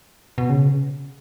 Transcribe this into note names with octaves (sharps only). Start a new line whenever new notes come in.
B2
C#3